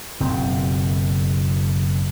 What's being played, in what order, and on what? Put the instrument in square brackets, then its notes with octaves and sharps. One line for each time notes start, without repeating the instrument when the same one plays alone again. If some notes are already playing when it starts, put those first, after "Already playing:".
[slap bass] F#1 B2 C4